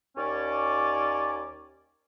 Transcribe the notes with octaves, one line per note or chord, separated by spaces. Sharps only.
D#2 C#4 D5